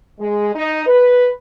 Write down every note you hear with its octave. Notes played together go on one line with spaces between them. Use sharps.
G#3
D#4
B4